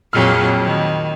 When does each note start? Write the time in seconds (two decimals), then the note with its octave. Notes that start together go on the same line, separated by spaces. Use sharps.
0.13 F2 A#2 F#3 G#4 F6
0.64 D#3